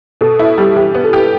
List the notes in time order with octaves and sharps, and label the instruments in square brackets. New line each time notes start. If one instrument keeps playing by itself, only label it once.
[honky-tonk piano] B2 [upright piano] A4
[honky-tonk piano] E4
[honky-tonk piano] G3 [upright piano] G4
[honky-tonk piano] E3 [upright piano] G4
[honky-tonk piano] B3
[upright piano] A4
[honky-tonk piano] G4